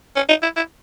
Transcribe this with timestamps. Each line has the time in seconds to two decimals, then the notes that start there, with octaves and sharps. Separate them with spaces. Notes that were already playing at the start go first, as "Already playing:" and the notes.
0.16 C#4
0.29 D#4
0.43 E4
0.56 E4